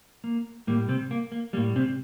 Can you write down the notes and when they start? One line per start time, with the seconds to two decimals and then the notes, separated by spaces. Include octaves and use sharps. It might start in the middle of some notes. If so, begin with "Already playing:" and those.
0.24 A#3
0.67 A2 G3 A#3
0.89 C3 C4
1.11 A#3
1.32 A#3
1.53 G3 A#3
1.57 A2
1.76 C3 C4